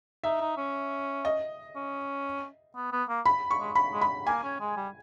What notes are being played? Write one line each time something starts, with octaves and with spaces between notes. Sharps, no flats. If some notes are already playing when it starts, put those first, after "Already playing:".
D#4 E5
D#4
C#4
D#5
C#4
B3
B3
A#3
B5
C#6
G#3
B5
G#3
B5
A#3 G#5
C#4
G#3
G3